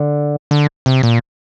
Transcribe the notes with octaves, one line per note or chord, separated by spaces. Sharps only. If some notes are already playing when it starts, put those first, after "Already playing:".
Already playing: D3
D3
C3
A#2